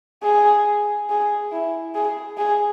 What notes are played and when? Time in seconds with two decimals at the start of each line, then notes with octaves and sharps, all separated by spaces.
0.23 G#4
1.10 G#4
1.52 E4
1.95 G#4
2.38 G#4